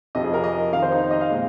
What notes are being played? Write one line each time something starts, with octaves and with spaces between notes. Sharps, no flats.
F2 C3 F3 D#5
G#4
A#4
D#5
F2 C3 D#3 F5
C5
D#4
D#5
F5
A#2 G#3